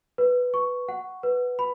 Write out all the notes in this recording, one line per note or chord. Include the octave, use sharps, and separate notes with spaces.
B4
C#6
F#5
B4
B5